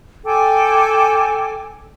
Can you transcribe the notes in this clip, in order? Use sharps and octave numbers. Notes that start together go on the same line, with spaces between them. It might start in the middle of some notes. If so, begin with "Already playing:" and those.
A4 G5 G#5 D6